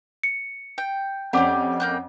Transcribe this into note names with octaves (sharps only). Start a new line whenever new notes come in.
C#7
G5
F2 C#4 G4 C5 D5 F#5 D6
A#3 G5 F#6